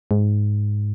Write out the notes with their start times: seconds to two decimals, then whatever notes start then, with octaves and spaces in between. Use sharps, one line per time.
0.11 G#2